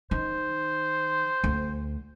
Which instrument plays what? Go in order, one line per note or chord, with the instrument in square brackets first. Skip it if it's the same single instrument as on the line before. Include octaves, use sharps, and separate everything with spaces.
[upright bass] D#3 [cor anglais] C5
[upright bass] D2